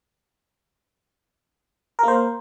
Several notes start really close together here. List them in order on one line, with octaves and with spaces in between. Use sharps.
A#4 A#3 C5